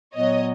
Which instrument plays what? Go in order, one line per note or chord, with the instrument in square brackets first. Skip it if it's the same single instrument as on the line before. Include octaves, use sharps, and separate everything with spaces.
[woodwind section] A#2 F#3 B3 [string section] C#5 D#5